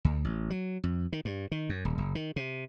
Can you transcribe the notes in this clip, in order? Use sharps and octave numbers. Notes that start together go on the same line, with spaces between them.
D2
A1
F#3
F2
D#3
G2
D#3
F#2
D#1
F#1
D#3
C3